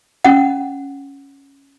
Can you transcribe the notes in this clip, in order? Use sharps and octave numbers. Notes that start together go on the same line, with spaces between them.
C#4 F#5